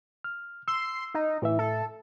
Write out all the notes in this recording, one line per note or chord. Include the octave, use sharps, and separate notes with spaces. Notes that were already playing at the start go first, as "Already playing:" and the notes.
F6
C6 E6
D#4
A2 E3 E5
A4